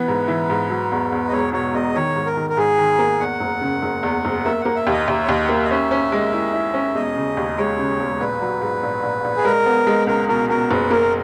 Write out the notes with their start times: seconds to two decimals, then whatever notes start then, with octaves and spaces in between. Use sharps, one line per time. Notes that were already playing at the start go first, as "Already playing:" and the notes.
Already playing: E3 B3 B4
0.08 G#2
0.28 E3
0.50 G#2
0.70 F#3
0.92 E2
1.12 E2
1.28 D#5
1.32 E1 C#5
1.53 B2 C#5
1.74 E2 D#5
1.95 D#3 C#5
2.16 G#2
2.26 A#4
2.37 D#3
2.50 A#4
2.57 G#2 G#4
2.78 D#3
2.99 A#3
3.20 E2 F#5
3.40 F#1
3.61 C#3
3.82 F#1
4.03 E2
4.25 F#1
4.45 A#3 E5
4.61 A#3 F#5
4.76 E5
4.87 D#2
4.92 D#5
5.08 D#2 E5
5.24 C#5
5.28 D#2 D#5
5.44 F#5
5.49 A#3 E5
5.64 D#5
5.71 C#4 E5
5.91 C#4
6.12 G#3
6.33 E4
6.54 E4
6.74 C#4
6.95 E1 D#5
7.16 C#3
7.37 D#2
7.58 G#3 C#5
7.79 C#3
8.00 E1
8.20 A#1 B4
8.42 F#3
8.61 G#2
8.83 A#1
9.03 A#1
9.24 A#1
9.37 G#4
9.45 G#3 A#4
9.66 B3
9.87 G#3
10.07 C#2 A#4
10.29 B2 A#4
10.49 B2 A#4
10.70 F#1 B4
10.91 A#3 A#4